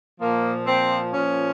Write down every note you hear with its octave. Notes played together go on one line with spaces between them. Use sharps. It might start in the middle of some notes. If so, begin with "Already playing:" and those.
A#2 F3 A#3
C4
A#2 F3 C#4